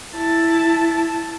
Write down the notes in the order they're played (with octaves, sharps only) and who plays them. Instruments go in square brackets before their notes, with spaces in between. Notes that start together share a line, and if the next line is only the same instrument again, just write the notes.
[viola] E4 A5